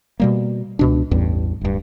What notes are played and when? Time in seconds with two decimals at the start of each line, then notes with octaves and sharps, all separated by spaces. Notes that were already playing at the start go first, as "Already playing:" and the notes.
0.20 B2 G3 A#3
0.79 C#2 B2 D4
1.11 A1 E2 G2
1.61 D1 G2